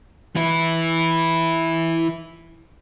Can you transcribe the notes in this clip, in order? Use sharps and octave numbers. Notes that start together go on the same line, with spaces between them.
E3 E4